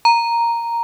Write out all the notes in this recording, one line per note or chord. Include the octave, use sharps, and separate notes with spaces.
A#5